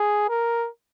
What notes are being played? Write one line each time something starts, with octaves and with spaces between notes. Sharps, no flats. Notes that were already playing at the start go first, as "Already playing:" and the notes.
Already playing: G#4
A#4